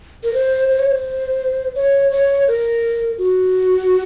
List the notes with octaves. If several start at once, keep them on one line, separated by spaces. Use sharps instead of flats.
A#4
C5
C5
C#5
C5
C#5
C#5
A#4
F#4